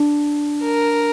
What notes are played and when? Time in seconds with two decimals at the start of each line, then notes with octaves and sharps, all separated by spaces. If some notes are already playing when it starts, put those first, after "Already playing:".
Already playing: D4
0.63 A#4